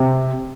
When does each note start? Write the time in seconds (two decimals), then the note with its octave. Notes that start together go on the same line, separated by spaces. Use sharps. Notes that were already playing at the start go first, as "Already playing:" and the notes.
Already playing: C3